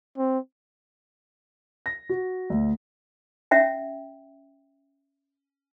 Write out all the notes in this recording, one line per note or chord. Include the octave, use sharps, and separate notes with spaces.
C4
A#6
F#4
D2
C#4 E5 F#5 G5